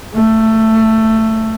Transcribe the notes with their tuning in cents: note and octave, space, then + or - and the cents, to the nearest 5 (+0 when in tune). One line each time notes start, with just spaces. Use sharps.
A3 +15